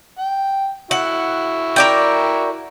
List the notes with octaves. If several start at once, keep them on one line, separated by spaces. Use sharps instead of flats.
G5
E4 F#4 F#5
A#4 D5 G5